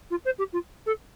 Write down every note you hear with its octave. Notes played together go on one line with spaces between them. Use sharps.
F4
C5
G4
F4
A4